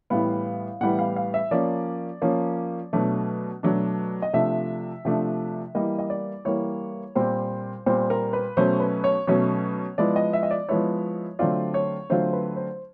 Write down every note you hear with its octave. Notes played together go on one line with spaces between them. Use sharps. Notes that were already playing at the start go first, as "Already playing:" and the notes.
A2 E3 G3 B3 F5
A2 E3 G3 B3 F#5
F5
F5
E5
F3 A#3 C#4 D5
F3 A#3 C#4
B2 F#3 A3 D4
B2 F#3 A3 D4
D#5
C3 F3 A3 D4 E5
C3 F3 A3 D4
E3 G3 A#3 D#5
D#5
D5
E3 G3 A#3 C#5
A#2 G3 C4 C5
A#2 G3 C4 C5
A#4
B4
B2 F#3 A3 C#4 C5
B4
C#5
B2 F#3 A3 C#4 C#5
F3 G#3 B3 E4 D5
D#5
E5
D#5
D5
F3 G#3 B3 E4 C#5
D3 F#3 A3 C4 F4 D5
C#5
D3 F#3 A3 C4 F4 C5
B4
C5